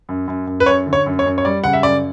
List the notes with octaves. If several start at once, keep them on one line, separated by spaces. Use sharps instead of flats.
F#2
F#2
F#2
B4
F#2 C#5
D3
C#5
F#2
C#5
F#2
C#5
G3 D5
C#3 F#5
E5
F#2 D5